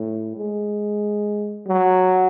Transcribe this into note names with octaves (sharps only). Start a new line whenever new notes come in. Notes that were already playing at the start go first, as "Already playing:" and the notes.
Already playing: A2
G#3
F#3